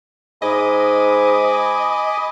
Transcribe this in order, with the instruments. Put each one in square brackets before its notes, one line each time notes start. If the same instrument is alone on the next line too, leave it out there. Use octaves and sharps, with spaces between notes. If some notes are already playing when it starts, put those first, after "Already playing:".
[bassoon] G#2 [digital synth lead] D#5 [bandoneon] G#5 B5 D6